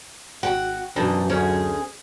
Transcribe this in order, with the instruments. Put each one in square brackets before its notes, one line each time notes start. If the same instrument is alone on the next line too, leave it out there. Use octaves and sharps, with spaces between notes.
[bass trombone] G#1 [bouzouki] F#4 [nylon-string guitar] G5
[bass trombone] F#2 [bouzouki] B2 [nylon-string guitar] E3 D4 D#4
[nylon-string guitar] D2 C#4 C#5 [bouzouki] G#4